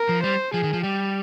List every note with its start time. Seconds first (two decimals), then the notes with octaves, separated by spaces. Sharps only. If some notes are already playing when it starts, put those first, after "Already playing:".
Already playing: A#4
0.09 F3
0.23 G3 C5
0.54 F3 G#4
0.64 D#3
0.73 F3
0.83 G3 G4